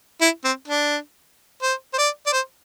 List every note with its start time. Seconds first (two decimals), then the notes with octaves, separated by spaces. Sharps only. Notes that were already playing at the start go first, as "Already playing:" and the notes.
0.21 E4
0.44 C4
0.68 D4
1.63 C5
1.94 C5
1.98 D5
2.27 D5
2.33 C5